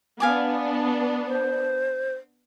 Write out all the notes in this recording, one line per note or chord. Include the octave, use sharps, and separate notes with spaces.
B3 D4 F5 G#5 D6
C5